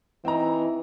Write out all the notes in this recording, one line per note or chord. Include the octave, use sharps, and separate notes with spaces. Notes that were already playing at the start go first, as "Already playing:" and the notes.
E3 C4 D#4 A#5